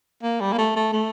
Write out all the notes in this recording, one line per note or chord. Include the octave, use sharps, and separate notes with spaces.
A#3
G3
A#3
A3
A3
A3